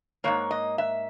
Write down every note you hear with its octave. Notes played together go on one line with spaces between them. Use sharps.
G#2 E3 A#3 C#5
D#5
E5